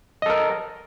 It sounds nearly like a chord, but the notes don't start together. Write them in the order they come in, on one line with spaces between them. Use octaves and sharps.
D#5 A4 A#4